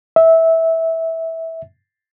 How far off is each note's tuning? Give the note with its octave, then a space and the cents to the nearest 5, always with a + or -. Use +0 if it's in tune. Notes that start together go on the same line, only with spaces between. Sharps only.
E5 -15